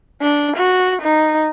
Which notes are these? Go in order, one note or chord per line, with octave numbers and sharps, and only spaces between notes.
D4
F#4
D#4